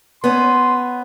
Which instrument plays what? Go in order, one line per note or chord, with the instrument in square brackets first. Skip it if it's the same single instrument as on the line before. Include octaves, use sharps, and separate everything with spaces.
[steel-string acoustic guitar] B3 C#4 [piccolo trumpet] C6